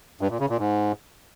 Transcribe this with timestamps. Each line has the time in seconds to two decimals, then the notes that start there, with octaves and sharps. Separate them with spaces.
0.21 G2
0.31 A#2
0.40 C#3
0.49 A#2
0.59 G#2